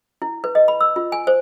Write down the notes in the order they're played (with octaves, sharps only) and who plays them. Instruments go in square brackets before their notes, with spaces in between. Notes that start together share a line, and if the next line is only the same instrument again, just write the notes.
[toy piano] E4
B4
D#5
B5
E6
F4
G#5
C5